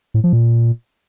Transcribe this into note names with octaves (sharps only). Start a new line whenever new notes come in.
A2
F3
A#2